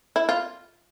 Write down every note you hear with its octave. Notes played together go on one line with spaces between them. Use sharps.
E4
F4